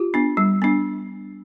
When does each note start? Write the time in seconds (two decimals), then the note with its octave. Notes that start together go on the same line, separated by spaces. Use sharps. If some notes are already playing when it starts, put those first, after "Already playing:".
Already playing: F4 G4
0.14 B3 D4
0.37 G3
0.62 B3 D4